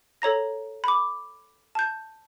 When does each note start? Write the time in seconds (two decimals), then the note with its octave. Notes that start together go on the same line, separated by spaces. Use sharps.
0.22 A4 C#5 A#5 A#6
0.84 B5 D6
1.75 A5 G6